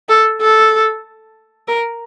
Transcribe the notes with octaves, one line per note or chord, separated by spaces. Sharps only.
A4
A4
A#4